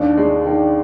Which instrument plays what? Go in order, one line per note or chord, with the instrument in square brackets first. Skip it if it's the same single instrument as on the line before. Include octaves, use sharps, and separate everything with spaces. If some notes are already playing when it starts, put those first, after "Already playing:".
Already playing: [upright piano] D#2 [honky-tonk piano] D4
[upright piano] G#3
D#3